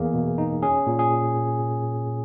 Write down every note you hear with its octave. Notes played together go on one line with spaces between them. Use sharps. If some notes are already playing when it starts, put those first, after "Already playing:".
Already playing: E2 A#3 G#4
B2
D#4
C#4 G#4
A#2
G#4